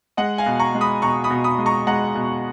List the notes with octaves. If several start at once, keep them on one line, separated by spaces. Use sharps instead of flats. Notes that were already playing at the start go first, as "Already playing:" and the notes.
G#3 D#5 F#5
F5 G#5
B2
A#5 C#6
G#3
B5 D#6
B2 A#5 C#6
B5 D#6
B2
B5 D#6
G#3
A#5 C#6
G#3 F#5 A#5
B2